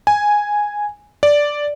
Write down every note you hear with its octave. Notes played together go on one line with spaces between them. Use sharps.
G#5
D5